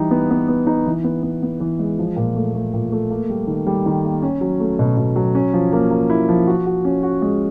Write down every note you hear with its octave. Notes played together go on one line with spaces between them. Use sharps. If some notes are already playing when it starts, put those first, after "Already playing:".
Already playing: E3 G3 D#4
B3
B3
B3
D#4
E3
B3
B3
B3
E3
G#3
F3
A#2
A3
A3
A#2
A3
A#3
G3
D#3
G3
D#3
A#3
C#4
F#3
A3
B2
B2
F#3
C#4
F3
A#3
A#3
E4
F3
F#4
F#4
C#4
F#4
G#3